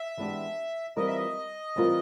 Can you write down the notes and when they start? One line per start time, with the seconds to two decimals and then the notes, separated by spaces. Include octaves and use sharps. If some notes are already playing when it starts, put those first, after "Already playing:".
Already playing: E5
0.17 E3 G#3 B3 D4 G4
0.96 E3 G3 C4 F4 A#4 D#5
1.07 E5
1.16 D#5
1.76 E3 G3 C4 F4 A#4